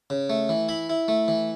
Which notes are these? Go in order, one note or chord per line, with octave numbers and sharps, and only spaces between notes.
C#3
A3
E3
E4 B5
E4
A3
E3